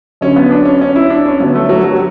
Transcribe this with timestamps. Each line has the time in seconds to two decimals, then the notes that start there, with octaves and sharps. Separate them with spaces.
0.21 F#2 D3 F#3 C#4
0.36 B3
0.51 D4
0.65 C#4
0.81 C#4
0.96 E4
1.10 D4
1.26 C#4
1.40 G2 D3 F#3 B3
1.55 A3
1.69 F#3
1.84 F#3
1.92 G3